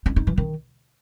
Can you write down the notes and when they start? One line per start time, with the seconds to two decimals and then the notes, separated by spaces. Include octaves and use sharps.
0.06 D#4
0.16 D#4
0.27 E3
0.37 D#3